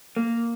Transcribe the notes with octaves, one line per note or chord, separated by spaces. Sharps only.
A#3